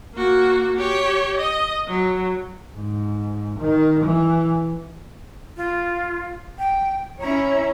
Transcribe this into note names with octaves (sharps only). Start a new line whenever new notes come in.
A#3 F#4
G4 C#5
D#5
F#3
G#2
D#3
E3
F4
G5
C#4 E4 C#5 A#5